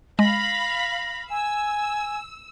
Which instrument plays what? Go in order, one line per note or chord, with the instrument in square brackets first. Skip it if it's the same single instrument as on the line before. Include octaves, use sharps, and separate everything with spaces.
[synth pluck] G#3 [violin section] F5 B5 [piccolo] A#6
[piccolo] G#5 [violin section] E6